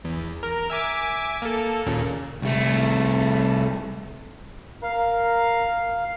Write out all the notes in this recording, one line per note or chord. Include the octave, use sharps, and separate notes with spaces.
E2
A#4
E5 G#5 D6
A#3 A4
D#2 A#2 C#3
C2 A3
A#4 F5